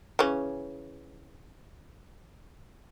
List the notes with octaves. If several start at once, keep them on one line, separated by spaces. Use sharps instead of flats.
C#3 E3 C#4